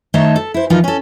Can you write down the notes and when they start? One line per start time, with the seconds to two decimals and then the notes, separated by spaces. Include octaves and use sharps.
0.14 D#3 A3 D#4 C#5 E5 A5
0.36 A4
0.54 E4 C5
0.70 E3 F3 D#4 F4 A#4
0.84 C#4 A4